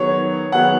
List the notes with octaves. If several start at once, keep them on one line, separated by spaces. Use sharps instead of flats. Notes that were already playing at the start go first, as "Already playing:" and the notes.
Already playing: D#3 F#3 B3 G#4 C#5
D#3 F#3 B3 G#4 F#5